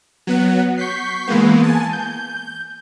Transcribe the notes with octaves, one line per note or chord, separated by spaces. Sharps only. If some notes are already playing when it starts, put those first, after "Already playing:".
F#3 B3 F#5
C#6 G6 B6 C7
E3 G#3 A#3 B3
G#5 A5
G6